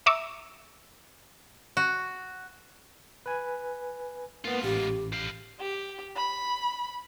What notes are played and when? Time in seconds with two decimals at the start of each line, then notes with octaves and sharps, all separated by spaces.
0.06 E5 A#5 C#6 D6 E6
1.77 F#4
3.26 B4 G#5
4.45 G#2 A#3 B3 F4
4.63 A1 G4
5.12 G4 F5
5.60 G4
6.16 B5